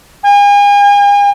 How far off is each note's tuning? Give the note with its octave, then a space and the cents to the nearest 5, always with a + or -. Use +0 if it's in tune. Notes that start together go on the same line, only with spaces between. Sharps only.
G#5 -40